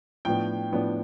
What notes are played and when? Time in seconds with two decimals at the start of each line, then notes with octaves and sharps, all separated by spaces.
0.25 A2 F3 B3 D4 G5
0.72 A2 F3 B3 D4